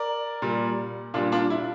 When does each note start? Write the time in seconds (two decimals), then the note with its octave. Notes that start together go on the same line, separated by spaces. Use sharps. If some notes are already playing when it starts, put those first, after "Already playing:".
Already playing: A#4 D5
0.42 A#2 G3
1.14 A#2 G3 D4 F4
1.32 D4 F4
1.50 E4